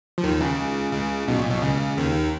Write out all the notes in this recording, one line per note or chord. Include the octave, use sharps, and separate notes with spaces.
F3
D#2 D#3
C#2 C#3
C#2 C#3
B1 B2
A#2
B1 B2
C#2 C#3
D#2 D#3